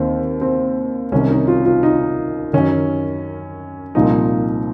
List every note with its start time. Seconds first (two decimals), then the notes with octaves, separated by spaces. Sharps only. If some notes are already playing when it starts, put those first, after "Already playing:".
Already playing: D#2 D#3 C4
0.41 C4
1.12 C2 C3 D#3 C#4
1.30 D#4
1.47 F4
1.65 F4
1.83 D#4
2.53 F#2 D#3 C#4
3.95 C2 A#2 F3 D#4